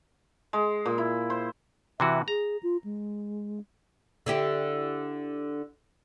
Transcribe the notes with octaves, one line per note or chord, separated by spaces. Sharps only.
G#3
A#2
E4
C5
C3 E3 F#4 E5
G#4 A#5
F4
G#3
D3 E4 G4